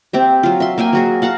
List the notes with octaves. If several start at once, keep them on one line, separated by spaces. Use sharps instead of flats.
C4 G4 E5
F#3 F4
E5 C6
A#3 E5 G5 G#5
F#3 F#4 G#4
F5 F#5 A5 A#5